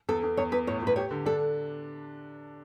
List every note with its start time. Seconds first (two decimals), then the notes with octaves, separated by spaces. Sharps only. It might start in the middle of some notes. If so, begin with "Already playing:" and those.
0.09 E2 A4
0.23 E2
0.37 E2 C#5
0.52 E2 B4
0.67 A2 C#5
0.82 A2 B4
0.96 G4 C#5
1.11 D3
1.26 D4 A4